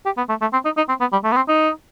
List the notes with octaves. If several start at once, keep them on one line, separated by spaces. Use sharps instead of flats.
G4
B3
A3
A3
C4
D#4
D#4
C4
B3
G3
A3
B3
C4
D#4